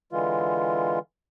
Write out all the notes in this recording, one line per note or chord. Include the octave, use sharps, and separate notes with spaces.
D3 E3 G#3 F4